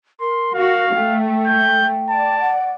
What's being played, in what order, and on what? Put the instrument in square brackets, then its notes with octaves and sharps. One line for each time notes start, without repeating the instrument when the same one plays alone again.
[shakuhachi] A#4 [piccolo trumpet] C6
[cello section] F#4 [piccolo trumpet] F5
[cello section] A3 [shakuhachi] G5
[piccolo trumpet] G6
[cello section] D5 [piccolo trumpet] A5
[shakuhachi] F#5